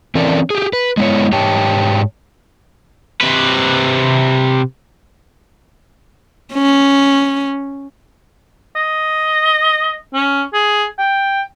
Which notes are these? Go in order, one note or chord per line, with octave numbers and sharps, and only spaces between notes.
E3 C4 C#4 A4 A#4 D5
G4 G#4
B4
G#3 B3 D#4 E4 C#5
G#2 G4 C#5 G5 A5
C3 B4
C#4
D#5
C#4
G#4
G5